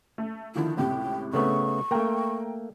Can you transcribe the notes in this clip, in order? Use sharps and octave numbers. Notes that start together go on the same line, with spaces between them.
A3
D3 D#3 F3 E4
C#2 A2 C3 G5
C#3 A3 B3 C#6
A3 A#3 G5 A#5